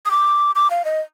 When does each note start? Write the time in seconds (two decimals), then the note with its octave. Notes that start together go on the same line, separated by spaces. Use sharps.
0.06 D#6
0.11 D6
0.55 D6
0.71 F5
0.85 D#5